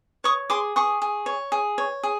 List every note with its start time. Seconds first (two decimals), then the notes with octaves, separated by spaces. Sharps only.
0.24 C#5 C#6 D#6
0.50 G#4 C6 D6
0.76 G#4 C#6 D#6
1.02 G#4
1.26 C#5
1.52 G#4
1.78 C#5
2.03 G#4